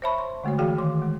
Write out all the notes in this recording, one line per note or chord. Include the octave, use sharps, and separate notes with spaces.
C5 C#5 E5 A5 B5 C#6
C6
D3 G#3 A3 F#4 C#5
E3 F#4 G#4 D5 F5 G5
D#3 C6 D6
G#3